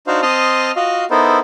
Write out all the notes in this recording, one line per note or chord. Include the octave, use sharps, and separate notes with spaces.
D4 D#4 F#4 C5 F5
C4 D#5 A5 C6 D#6 F6
F4 F#4 D#5 F5
B3 D#4 E4 A4 A#4 C5